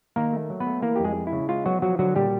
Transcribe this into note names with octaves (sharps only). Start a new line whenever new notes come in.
D#3 A#3 A#4
A3
F#3
B3 B4
A3
E3 A#3 A#4
F2 G4
G#3 G#4
G#3
E4
C#3
G#3 F4
F#3 B3 F#4
F3 F#3 F#4
D3 F#3 F#4
A#2 G3 G4